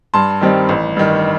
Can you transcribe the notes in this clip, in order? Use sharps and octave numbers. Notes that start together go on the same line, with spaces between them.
G2 A5 C6
D#3 G3 C4 D#4
A1
G2 D#3